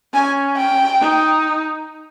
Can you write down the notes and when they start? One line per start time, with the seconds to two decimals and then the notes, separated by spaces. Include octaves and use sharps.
0.14 C#4 G#5
0.57 G5
1.01 D#4